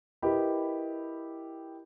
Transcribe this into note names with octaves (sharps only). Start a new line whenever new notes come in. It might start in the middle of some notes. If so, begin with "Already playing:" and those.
E4 G4 A#4 B4 D#5 B5